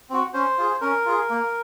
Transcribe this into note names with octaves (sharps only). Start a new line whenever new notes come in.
C4 F#4
C#4 C5
F4 G#4
C#4 A#4
F4 G#4
A#3